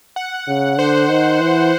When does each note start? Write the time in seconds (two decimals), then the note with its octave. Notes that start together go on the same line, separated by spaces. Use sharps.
0.16 F#5
0.47 C#3
0.78 D3 C5
1.09 D#3
1.40 E3